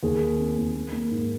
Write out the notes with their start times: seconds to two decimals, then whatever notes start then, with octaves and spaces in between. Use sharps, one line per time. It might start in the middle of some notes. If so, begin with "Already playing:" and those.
0.03 D#2 G#4
0.21 D#3
0.39 C4
0.57 D#2
0.75 A#3
0.93 A#3
1.11 G#2